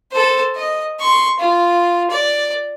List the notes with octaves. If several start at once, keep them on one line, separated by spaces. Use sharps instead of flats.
A4 C5
D#5
C6 C#6
F4
D5